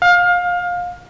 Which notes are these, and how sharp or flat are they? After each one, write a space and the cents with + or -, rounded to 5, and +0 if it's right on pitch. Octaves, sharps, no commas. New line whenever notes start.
F5 +25